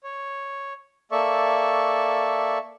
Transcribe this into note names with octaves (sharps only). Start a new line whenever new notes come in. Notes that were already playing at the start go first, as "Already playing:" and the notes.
C#5
A#3 A4 D5 E5 C#6